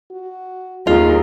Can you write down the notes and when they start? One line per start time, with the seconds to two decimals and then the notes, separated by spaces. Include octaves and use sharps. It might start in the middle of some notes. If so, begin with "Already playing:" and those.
0.11 F#4
0.87 D#2 D#4 F4 G#4